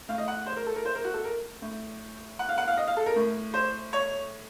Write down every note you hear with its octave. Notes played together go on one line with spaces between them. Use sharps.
A2 F5
D#5
F#5
C5
A#4
A4
A#4
C5
A#4
F#4
A4
A#4
A2
F#5
F5
F#5
F5
D#5
F5
A4
A#4
A2
C5
C#5